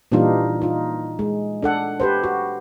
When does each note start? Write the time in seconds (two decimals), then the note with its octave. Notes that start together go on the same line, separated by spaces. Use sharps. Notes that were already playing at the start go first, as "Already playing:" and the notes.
0.12 A#2 E3 G3 D4 D#4 F4
0.62 D#4 F4
1.19 G#3
1.62 D4 A4 F#5
2.00 G4 B4 C5
2.24 F#4